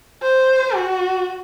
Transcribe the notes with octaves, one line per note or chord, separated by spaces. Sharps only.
C5
F#4